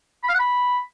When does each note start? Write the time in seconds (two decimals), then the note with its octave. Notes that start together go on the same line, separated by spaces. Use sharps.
0.24 B5
0.29 F5
0.34 F#5
0.39 B5